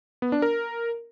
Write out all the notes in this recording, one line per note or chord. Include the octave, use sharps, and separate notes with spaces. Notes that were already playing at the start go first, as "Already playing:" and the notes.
B3
D4
A#4